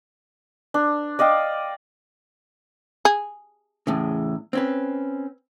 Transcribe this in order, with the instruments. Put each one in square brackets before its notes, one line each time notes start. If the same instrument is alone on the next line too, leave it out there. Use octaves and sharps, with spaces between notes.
[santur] D4
D5 D#5 F5 G5
[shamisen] G#4
[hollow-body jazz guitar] E2 A2 C#3
C4 C#4 B4